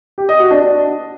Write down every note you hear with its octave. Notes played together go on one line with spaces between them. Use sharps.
G4
D#5
F#4
D4
D4